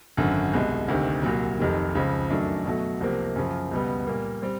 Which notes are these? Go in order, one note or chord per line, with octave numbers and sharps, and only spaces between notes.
G#1 F#2 D3
C2 B2 G#3
D2 C3 D#3
C2 A#2 F#3
F1 F2 C3 D#3
C#2 C#3 F3
F#2 D#3 F#3 A3 D4
B2 F#3 A3
C2 C3 F3 A#3
F#2 C#3 F3
C#2 B2 G3 B3
A#2 G3 A#3
G3 C4